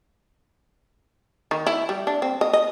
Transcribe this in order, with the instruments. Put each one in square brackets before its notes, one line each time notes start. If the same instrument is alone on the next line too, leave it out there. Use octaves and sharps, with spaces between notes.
[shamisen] D#3
E4
G3
D4
C4
D#5
D#5